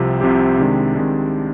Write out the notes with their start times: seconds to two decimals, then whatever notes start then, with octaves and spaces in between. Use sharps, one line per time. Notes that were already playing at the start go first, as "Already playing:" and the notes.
Already playing: C2 C3 F3 C4 G4
0.21 C2 C3 F3 C4 G4
0.58 C3 D#3 G#3 D4
0.95 C3 D#3 G#3 D4